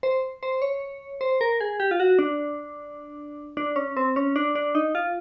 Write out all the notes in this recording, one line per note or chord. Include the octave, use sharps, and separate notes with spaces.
C5
C5
C#5
C5
A#4
G#4
G4
F4
F#4
D4
D4
C#4
C4
C#4
D4
D4
D#4
F4